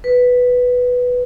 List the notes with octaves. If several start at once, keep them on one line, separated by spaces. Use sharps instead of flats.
B4